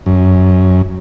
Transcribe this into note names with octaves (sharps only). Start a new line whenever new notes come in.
F#2